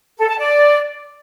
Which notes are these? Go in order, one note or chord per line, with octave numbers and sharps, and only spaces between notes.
A4
A5
D5